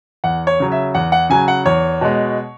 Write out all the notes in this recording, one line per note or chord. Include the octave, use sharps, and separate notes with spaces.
E2 F#5
C#5
C#3 F#3
E5
E2 F#5
F#5
C#3 F#3 G#5
F#5
E2 C#5
B2 G#3